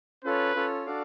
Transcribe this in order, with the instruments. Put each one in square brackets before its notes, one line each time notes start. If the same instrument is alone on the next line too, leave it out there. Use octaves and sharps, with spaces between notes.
[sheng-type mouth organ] C#4 F4 A4 C#5 [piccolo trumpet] B4
[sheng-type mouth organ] C#4 F4 A4 C#5
D4 F#4 A4 D5 F5